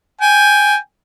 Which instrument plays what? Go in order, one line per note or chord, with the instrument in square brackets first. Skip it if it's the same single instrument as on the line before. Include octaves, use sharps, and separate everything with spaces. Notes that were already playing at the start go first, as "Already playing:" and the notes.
[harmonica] G5 G#5